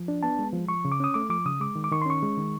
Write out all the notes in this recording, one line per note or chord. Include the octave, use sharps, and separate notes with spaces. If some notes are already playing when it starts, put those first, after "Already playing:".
Already playing: F3
D4
B3 A5
G#3
F3
F3 C#6
C#3
D6
C#4 D#6
A3 D6
F3 D6
C#3 D#6
G#3 D6
D#3
D6
D#3 C#6
C6
C#4 C#6
G#3
D#3